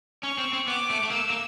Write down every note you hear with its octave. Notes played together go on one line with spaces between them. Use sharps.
C#4 C#6
C4
C4
B3 D6
A3
A3
A#3 E6
A#3